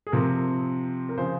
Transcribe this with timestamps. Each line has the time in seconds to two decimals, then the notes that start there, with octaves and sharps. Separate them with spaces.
0.07 G#4
0.12 C3 F3 C4 A#4
1.09 A#4
1.18 C#3 F3 C5